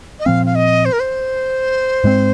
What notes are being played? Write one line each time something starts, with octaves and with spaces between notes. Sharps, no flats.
D#5
A#2 F3 C4 F5
F5
D#5
C5
A#4
C5
G#2 G#3 C4